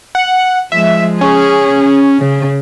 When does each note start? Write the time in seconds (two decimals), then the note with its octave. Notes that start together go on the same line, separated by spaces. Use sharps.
0.15 F#5
0.72 F3 G#3 E5
1.21 C#4 G#4
2.19 C#3